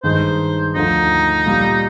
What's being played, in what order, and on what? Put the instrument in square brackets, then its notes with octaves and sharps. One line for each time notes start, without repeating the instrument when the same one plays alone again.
[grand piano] G2 D#3 G#3 D#4 [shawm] C5
[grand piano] D2 D3 F3 [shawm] D#4
[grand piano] A#2 G3 A#3